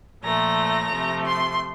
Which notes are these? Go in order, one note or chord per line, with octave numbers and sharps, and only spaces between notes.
A#2 F3 A3 A#5
C3 F3 A3
C6